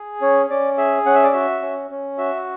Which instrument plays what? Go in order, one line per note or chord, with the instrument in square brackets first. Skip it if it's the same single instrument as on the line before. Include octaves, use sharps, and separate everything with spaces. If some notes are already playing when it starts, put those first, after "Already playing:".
Already playing: [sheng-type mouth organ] G#4
C#4 C#5
C#4 D5
G#4 E5
C#4 F#5
E5
D5
F#4 E5
C#4
C#4
F#4 E5